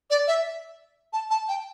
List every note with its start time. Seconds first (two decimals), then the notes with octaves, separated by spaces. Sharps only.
0.10 D5
0.28 E5
1.13 A5
1.31 A5
1.49 G5